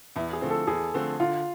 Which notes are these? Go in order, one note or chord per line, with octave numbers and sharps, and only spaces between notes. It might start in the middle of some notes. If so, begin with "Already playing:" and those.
E2 E4
G#4
D3 F3 A3 C4
A4
E2 G#4
D3 F3 A3 C4
D3 F4